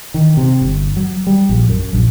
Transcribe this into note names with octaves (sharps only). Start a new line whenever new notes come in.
D#3
C3
G1
F#3
G3
A#1
F#2
A#1